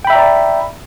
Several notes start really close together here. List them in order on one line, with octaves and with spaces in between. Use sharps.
G5 B5 E5 A#5 D5